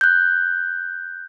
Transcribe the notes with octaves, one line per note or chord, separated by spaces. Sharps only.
F#6 G6